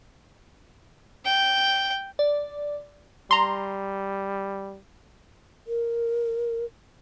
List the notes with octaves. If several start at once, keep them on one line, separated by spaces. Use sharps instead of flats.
G5
D5
G3 A#5 C6
A#4